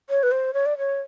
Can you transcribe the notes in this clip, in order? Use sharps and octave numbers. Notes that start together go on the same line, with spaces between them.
C#5
B4
C5
C#5
D5
C#5